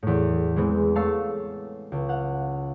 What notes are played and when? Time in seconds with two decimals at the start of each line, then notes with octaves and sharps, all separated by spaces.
0.03 E2 A2
0.56 E3 G#3 B3 C4
0.95 A3 C#5 F5 A5 E6 C7
1.92 C#2
2.09 F5 F#5